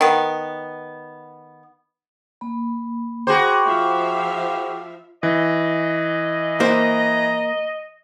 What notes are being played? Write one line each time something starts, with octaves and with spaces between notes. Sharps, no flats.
D#3 B3
A#3 B5
F#4 G#4 C5 G5 B5 D6
F3 E5 F5
E3 D#5
A#3 C5 A#5